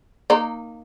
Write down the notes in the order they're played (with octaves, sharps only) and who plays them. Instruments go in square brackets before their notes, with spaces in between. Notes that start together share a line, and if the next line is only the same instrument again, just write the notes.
[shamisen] A#3 D#4